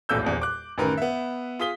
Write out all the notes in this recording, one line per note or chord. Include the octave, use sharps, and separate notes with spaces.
D#1 B1 E2 A2 E6 G6
D#1 A#1 E2
D6 F#6
A1 F#2 D#3 A#4 B4 B5
B3 E5
F4 G#4 D#6 B6 G7